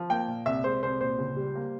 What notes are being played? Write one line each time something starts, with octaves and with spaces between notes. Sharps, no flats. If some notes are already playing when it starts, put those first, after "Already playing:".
Already playing: F3
A#3 G5
A#2
C2 E5
G#3 C5
C2 C5
A#2 C5
C#2
G3
A#3